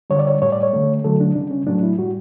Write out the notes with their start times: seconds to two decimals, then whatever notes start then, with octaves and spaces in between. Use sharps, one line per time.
0.10 D3 G3 C#5
0.19 D5
0.27 C#5
0.42 A2 G3 C#5
0.52 D5
0.63 C#5
0.73 D3 A3
1.04 D3 F#3 A3 A4
1.20 D4
1.35 C#3 G3 D4
1.51 C#4
1.67 A2 F#3 A3 D4
1.83 E4
1.98 A2 G3 F#4